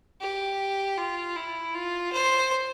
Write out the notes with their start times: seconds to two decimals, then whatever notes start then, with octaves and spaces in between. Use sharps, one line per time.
0.21 G4
0.98 F4
1.36 E4
1.75 F4
2.13 C5